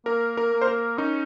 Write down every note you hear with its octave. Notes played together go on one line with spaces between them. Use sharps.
A#3 A#4
A#4
A#3
C5
A#4
C#4 D#4